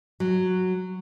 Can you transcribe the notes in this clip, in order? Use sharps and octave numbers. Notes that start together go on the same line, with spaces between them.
F#3